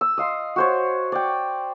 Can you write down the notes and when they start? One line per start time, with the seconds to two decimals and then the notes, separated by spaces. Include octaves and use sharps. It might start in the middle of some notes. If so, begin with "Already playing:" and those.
0.01 E6
0.18 D#5 F5 C6
0.56 F#4 C5 C#5
1.12 D5 G5